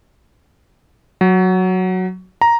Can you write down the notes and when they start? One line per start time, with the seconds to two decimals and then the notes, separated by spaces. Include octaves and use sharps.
1.21 F#3
2.41 A#5